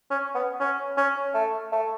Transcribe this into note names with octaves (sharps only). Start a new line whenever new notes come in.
C#4
B3
C#4
C#4
A3
A3